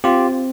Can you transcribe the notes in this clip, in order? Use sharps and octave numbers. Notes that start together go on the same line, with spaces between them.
C4 F4 G4